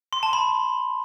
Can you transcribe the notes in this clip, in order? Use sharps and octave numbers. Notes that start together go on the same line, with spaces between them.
C6
A5
B5